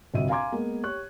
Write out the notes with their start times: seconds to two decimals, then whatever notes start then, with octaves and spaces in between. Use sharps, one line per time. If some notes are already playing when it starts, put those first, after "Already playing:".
0.14 G1 C2 F#4 D#5 E5 D#7
0.29 F5 G#5 A#5 C6 D6 G#6
0.52 G#3 A#3 B3 A#4
0.84 G4 C#5 C#6 F#6